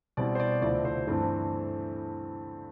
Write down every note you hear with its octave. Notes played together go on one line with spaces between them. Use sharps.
B2 G3 C4 E4 D5
C5
D5
D2 C3 F3 C4 E4 D5
C5
G2 E3 A3 C4 E4